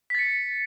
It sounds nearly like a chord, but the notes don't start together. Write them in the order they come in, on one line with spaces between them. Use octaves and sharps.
B6 A6 C#7